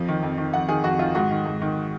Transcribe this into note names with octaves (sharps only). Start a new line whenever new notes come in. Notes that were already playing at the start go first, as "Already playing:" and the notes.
Already playing: F2 F3
D#3
F2
D#3
F2 F#5
D#3 G#4
F2 F#4
D#3 F4
G#2 F#4
D#3
G#2
D#3